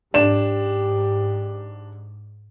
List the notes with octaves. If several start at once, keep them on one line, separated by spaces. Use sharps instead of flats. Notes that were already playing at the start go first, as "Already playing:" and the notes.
G#2 D4 G4 E7